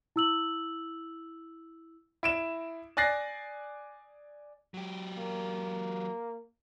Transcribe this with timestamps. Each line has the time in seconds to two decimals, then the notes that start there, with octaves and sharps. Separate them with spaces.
0.16 E4 E6 F#7
2.23 E4 D7 E7
2.97 D5 G#5 F#6 A6 A#6 C7
4.74 F#3 G4
5.18 A#3